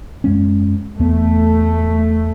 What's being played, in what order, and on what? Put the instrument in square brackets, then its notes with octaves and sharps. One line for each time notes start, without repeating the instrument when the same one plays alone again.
[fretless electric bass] F#2 G#3 C#4
[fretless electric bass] E2 B3 [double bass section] A3